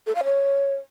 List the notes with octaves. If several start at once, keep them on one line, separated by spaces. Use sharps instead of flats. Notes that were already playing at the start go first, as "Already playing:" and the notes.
A4
F5
C#5